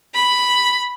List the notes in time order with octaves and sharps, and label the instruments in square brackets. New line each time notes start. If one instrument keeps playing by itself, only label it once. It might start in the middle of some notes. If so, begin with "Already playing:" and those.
[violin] B5